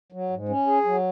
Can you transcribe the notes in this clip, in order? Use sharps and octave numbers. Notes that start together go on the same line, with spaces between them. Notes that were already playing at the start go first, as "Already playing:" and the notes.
F#3
G#2
C#4
G#4
F#3